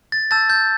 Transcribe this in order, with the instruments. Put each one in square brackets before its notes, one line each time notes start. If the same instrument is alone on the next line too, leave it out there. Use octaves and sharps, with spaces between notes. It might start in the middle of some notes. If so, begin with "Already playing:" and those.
[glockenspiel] A6
A5 E6 G6 A6
G6